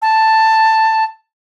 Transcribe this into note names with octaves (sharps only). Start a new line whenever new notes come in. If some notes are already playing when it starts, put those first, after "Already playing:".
A5